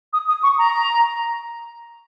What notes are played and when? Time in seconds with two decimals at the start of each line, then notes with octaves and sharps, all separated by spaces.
0.13 D#6
0.28 D#6
0.43 C#6
0.58 A#5